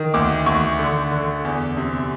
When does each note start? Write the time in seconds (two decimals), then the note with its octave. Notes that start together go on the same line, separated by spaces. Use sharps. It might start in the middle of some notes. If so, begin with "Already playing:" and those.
Already playing: D#3
0.14 D2 D6
0.46 D2 C#6
0.79 D3
1.11 D3
1.45 E2
1.77 C3